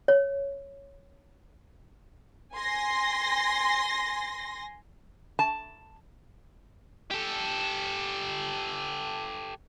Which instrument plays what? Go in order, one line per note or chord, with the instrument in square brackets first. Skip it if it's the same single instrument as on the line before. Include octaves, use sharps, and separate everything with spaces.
[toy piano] C#5
[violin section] G#5 C6 A#6
[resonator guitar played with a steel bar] A5
[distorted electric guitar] G4 A4